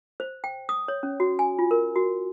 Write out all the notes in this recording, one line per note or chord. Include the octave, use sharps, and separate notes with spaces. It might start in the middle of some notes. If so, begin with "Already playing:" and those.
C5
G5
D#6
C#5
C#4
F#4
G#5
F4
A#4
F#4